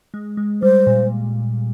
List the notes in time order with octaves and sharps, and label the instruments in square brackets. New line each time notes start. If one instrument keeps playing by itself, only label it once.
[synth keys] G#3
G#3
[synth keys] G3 [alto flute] C5
[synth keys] A#2